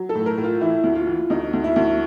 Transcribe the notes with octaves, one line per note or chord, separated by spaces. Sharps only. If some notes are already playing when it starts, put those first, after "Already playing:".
Already playing: F#3
A4
A2
A#4
A2
F4
E3 E4
D2
F4
E3
D2 D#4
D2
E4
D2